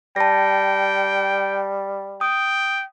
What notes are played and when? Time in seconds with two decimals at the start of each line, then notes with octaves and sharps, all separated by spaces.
0.16 G3 G5 A5 A#6
2.21 G5 D#6